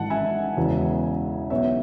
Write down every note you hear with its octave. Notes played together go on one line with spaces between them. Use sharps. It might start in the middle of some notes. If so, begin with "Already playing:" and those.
Already playing: G#1 G#2 E3 F#5 A5
E5 G#5
E1 E2 C#3 E3
B1 B2 C#5 E5